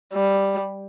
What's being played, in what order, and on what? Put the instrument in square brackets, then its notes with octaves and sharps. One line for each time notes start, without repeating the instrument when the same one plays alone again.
[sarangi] G3